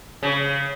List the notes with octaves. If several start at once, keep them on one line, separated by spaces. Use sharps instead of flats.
C#3